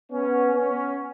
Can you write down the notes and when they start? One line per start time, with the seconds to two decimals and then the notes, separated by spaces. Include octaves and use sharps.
0.11 B3 C#4
0.55 B3 C#4